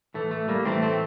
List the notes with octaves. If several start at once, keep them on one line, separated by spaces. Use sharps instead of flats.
A2 E3 A3
A3
G3 A#3
A2 E3 A3 C4
A3 C4